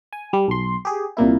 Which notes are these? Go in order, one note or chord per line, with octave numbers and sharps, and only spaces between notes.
G#5
G3
B1 C6
G4 G#4
C2 A#2 A#3 E4